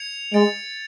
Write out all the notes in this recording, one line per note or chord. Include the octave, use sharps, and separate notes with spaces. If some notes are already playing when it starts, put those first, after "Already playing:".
Already playing: G#6 C#7 F7
G#3 A6 D7 F7